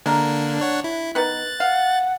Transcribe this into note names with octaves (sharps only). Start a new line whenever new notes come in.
D3 G#3 A#3 D4 A#4
D4 C#5 F#5
E4
D#3 B3 F#6 A6
F5 F#5